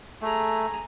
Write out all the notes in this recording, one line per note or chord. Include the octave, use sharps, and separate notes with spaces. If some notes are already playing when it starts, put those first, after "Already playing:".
A3 G#4 A#5